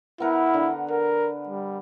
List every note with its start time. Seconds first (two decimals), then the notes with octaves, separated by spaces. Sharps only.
0.20 B3 E4 A#4 F#5
0.54 D3
0.90 A#4
1.49 G3